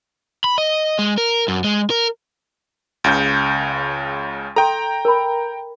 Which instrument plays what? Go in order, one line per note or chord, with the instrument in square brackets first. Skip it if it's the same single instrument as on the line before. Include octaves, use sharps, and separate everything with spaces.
[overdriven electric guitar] B5
D#5
G#3
A#4
F#2
G#3
A#4
[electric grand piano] C#2 C#3 G6
[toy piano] A4 C6 [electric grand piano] G5 A#5
[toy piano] A#4 B5